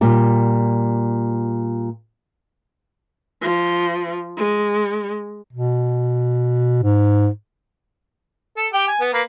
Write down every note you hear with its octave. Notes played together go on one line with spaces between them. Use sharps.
A#2 G3
F3
G#3
B2
G#2
A4
G4 G5
G#5
B3
A#3 B4